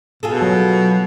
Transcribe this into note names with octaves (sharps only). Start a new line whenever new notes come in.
B2 F4 G#4 A4
F#3